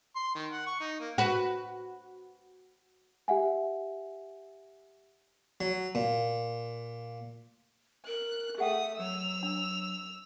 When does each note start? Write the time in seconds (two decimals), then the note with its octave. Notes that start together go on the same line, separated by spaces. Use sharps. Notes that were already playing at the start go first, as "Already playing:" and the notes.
0.16 C6
0.35 D#3
0.51 F#5
0.66 C#6
0.80 D#4
1.00 A#3
1.18 F#4 B4
3.28 G4 E5 F#5 G#5
5.61 F#3
5.95 A#2
8.07 A#4 F#6
8.58 A3 G#4 E5 F#5 G5 D#6
8.98 F#3 E6 F7
9.43 D4